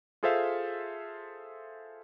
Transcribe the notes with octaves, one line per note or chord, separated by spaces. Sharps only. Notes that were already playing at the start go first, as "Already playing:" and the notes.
F4 G#4 A4 C5 E5 F5